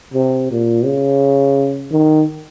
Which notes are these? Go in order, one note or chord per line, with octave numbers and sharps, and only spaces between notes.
C3
A#2
C#3
D#3